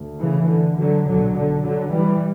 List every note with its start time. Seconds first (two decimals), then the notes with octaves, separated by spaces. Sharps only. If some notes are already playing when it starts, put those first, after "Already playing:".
Already playing: D2
0.20 C#3 E3
0.49 D3
0.78 D3 F#3
1.06 B1 A#2 D3 F#3
1.34 D3
1.63 D3 F#3
1.92 E3 G3